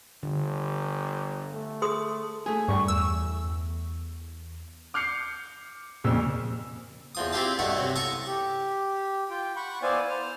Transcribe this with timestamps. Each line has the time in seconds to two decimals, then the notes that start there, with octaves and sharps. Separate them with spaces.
0.23 G1 D3
1.53 A3
1.82 G#4 C6 D#6
2.46 A3 G#4
2.68 G2 G3 C#6
2.88 E2 E6
4.94 D6 F6 G6 C7 C#7
6.04 F2 A#2 C#3 E6
7.15 E2 F3 D#6
7.33 C4 E4 F4 G4 F5 A5
7.59 G2 B2 A3 E4 F#5
7.77 C3 F#3
7.96 A4 A#5 C#6 D#6
8.26 G4
9.30 F4 G5
9.56 F#5 B5 C#6
9.82 B3 E4 C5 D5 F5 G#5
10.09 C5 F6